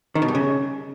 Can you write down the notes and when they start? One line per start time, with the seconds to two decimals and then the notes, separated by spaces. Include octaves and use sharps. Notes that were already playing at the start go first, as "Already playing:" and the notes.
0.15 D#3
0.22 B2
0.28 G2
0.35 C#3